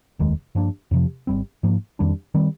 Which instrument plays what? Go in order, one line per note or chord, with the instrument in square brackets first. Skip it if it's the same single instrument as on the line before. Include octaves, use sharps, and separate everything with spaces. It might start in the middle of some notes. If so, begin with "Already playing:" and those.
[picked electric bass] F1 D#2 D#3 G#3
G2 F3 A#3 D4
F2 C3 F3
G#1 G#2 G3 C4
G#2 F3 A#3
F2 D#3 G3 D4
D#3 G3 C4